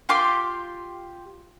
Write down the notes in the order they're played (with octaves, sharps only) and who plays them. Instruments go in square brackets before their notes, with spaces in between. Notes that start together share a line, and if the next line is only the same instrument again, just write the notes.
[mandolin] F4 G4 C6 D6